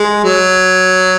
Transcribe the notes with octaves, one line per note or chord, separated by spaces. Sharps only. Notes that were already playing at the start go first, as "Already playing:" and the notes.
Already playing: G#3
F#3